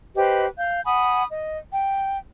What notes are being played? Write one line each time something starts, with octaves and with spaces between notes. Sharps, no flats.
G4 B4 C5 D#5
F5 G6
F#5 G#5 B5 D#6
D#5
G5